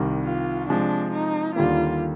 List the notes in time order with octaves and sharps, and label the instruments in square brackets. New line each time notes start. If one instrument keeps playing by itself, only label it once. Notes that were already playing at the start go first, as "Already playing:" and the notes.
Already playing: [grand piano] C2 C3 D#3 G3
[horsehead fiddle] F4
[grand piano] C3 F3 G#3 [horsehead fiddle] D4
[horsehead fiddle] D#4
[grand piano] D#2 D3 G3 A#3 [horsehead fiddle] F4